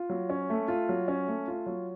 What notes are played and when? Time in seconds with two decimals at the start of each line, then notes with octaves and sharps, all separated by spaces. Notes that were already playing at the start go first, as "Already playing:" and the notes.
Already playing: F4
0.10 F#3
0.30 C#4
0.50 A3
0.68 F4
0.89 F#3
1.08 C#4
1.28 A3
1.48 F4
1.66 F#3